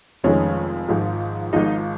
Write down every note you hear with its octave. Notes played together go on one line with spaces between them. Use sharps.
F1 F2 D#3 G#3 C#4
G#1 G#2 F3
G#1 G#2 F3 D#4